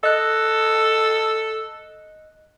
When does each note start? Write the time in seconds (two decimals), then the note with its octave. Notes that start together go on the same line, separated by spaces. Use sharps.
0.03 A4 D#5 F#6